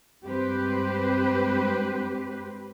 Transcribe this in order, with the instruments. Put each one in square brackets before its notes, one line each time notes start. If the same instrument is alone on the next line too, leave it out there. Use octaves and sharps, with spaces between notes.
[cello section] G2 G#3 C4 G4 B4 C5